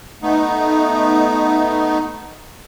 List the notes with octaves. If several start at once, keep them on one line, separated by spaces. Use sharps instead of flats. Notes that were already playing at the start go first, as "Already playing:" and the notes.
A3 B3 D#4